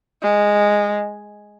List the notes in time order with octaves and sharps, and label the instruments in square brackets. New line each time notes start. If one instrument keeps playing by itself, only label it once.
[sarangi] G#3